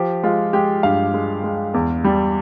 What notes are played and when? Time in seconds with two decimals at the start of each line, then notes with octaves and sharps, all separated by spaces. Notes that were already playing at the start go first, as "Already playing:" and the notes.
Already playing: F3 G4
0.23 G#3 F4
0.53 G#3 G4
0.83 G2 F5
1.14 G#3
1.43 G#3
1.74 E2
2.04 G3